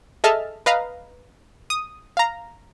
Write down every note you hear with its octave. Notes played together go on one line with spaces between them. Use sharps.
G#4 A4 D#5 E5 A5 F6
B4 D#5 F5 A#5
D#6
F5 A#5